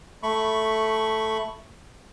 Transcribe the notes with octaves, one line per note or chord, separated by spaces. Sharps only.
A3 B5 C#6